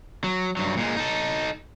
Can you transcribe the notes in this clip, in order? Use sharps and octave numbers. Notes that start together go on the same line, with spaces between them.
F#3
G2 F#3
A#2 G#3
D#4 A4